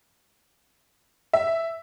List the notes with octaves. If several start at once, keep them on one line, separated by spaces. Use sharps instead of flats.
E5